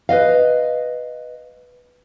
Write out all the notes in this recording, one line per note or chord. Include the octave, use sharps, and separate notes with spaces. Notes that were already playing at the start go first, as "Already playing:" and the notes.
B4 C#5 D#5 F5